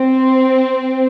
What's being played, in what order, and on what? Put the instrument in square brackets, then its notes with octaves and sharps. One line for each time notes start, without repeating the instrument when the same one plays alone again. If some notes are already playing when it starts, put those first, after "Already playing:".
Already playing: [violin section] C4